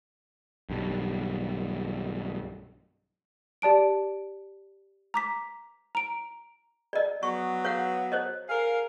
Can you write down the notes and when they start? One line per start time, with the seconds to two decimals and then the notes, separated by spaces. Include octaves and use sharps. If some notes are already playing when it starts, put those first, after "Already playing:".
0.70 B1 G2
3.62 G4 D5 A5 D7
5.14 A#5 D6 B6
5.95 A#5 D7
6.93 D5 D#5
7.23 F#3 B3 C#6
7.65 C#5 F5 F#5
8.12 C5 C#5 D#5
8.49 G#4 A#4 F5